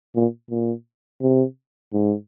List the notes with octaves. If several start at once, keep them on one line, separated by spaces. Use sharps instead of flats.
A#2
A#2
C3
G#2